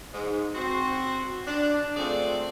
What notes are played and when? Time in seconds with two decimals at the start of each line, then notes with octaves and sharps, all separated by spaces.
0.14 G#2
0.55 C4 F#4 C5
1.47 D4
1.96 A3 C4 F4 G#4 C5 D5